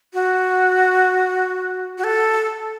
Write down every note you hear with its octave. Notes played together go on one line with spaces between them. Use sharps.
F#4
F#4
A4